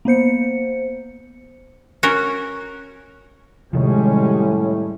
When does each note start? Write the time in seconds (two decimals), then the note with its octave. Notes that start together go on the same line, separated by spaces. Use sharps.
0.05 A#3 B3 C5 C#7
2.03 C#4 F#4 A#4
3.73 A2 C3 D#3 F3 G3 G#3 C#4